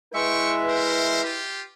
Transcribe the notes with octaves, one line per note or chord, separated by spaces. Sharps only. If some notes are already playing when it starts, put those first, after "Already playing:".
G#3 E4 B4 E5 G5 C#6
A#4 C5
F4 G4